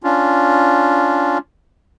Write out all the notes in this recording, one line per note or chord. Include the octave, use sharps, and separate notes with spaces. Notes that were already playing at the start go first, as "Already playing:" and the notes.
C#4 D4 F4